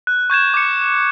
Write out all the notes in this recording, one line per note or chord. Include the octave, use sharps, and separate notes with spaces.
F#6
C#6 G6 G#6 E7
D6 C#7